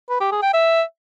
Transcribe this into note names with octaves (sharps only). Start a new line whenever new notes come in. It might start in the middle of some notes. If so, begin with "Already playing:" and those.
B4
G4
G#4
G5
E5